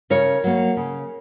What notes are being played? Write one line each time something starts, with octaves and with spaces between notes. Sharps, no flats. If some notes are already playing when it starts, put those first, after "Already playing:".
C#3 A#4 C#5
F#3 A#3
C#3